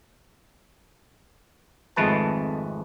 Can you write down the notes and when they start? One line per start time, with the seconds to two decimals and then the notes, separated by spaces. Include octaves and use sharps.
1.96 G#1 F2 G#3 A3 B4 A5